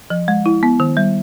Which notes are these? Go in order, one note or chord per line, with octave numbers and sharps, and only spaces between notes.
F3
G#3
E4
B3
D#3
G3